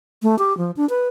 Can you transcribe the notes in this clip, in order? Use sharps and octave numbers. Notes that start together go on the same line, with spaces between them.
A3
G4
F3
D4
B4